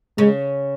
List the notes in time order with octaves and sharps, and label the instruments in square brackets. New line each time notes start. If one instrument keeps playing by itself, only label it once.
[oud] C#3 C#4 [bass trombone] G#3